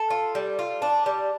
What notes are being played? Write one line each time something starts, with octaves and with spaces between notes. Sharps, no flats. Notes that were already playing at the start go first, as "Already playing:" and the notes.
Already playing: A4
F4
G3
F4
D4
G3